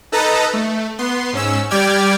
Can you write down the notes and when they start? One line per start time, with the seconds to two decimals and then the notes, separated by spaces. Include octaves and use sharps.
0.12 D#4 A4 B4 D#5 A5 A#5
0.53 A3
0.98 B3 C6
1.33 G#2 C#4 E6
1.70 G3 G4 D5 G5 F6 G#6